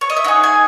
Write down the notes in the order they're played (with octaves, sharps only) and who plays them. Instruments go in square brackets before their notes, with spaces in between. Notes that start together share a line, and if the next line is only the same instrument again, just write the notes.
[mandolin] C#5
D#5
E5
D#4 G#4 F#5
G#5